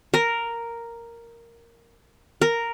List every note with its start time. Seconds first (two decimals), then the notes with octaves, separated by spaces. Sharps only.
0.14 A#4
2.42 A#4